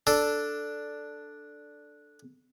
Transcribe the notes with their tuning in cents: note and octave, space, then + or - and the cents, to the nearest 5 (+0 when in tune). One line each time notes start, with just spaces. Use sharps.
D4 +0 A4 +0